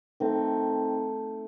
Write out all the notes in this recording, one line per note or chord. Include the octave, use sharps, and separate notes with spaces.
D#3 A3 C4